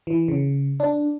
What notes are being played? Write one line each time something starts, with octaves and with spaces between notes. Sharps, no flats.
E3
C#3
D4